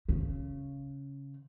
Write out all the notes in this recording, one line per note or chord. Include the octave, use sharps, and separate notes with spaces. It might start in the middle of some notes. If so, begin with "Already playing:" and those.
C#3